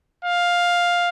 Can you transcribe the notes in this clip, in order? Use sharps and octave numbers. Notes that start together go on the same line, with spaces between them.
F5